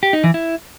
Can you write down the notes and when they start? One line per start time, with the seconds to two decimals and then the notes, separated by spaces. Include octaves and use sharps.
0.03 G4
0.13 D#4
0.24 E3
0.34 E4